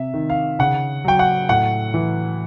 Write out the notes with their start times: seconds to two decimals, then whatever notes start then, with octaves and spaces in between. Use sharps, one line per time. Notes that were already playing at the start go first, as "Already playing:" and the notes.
Already playing: C3 E5
0.14 D#3
0.30 F5
0.59 C#3 F#5
1.05 F#3 G5
1.19 F#5
1.49 A2 F#5
1.94 E3